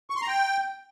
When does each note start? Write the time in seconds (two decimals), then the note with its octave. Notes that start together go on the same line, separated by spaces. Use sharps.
0.10 C#6
0.16 C6
0.22 A#5
0.28 G5